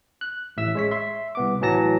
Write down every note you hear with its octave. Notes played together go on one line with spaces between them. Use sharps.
F#6
A1 A2 E5 E6
G#3 C#5 B6
E5 C6
C2 B3 D6
A2 E3 F#3 A5 A#6